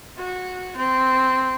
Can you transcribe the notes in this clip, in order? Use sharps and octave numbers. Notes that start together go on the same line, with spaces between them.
F#4
C4